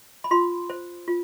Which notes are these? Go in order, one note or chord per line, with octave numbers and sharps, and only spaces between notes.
B5
F4 C6
C5
F4